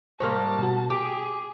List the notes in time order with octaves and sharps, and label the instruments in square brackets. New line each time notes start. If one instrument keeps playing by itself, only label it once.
[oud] G#2 G3 A#3 [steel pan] C5 [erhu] A5 [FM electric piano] C#6 F6
[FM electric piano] B2 F#4
[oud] G4 [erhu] G#4 [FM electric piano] D6